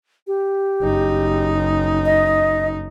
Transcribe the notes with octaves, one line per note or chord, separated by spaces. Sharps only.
G4
F#1 D#4
D#5